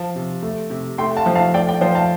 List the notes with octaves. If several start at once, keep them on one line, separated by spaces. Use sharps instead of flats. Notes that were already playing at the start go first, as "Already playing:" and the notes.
Already playing: F3 F5 A5
C3
A3
C3
A3 G5 C6
F5 A5
F3
F5 A5
A3 D5 G5
D5 G5
F3 C5 F5
F5 A5